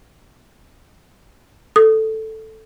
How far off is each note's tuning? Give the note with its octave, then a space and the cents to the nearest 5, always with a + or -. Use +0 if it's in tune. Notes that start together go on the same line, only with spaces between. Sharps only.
A4 +0 D#6 -10